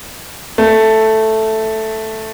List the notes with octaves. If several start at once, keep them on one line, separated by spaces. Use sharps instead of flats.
A3